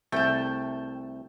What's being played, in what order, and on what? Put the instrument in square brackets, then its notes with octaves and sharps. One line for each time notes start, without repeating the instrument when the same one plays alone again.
[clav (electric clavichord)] C2 A3 [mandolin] G5 A5